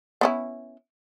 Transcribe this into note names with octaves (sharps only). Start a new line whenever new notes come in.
B3 C#4 E4